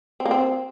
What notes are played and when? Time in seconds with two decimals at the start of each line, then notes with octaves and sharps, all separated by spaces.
0.20 C4
0.25 A#3
0.31 C4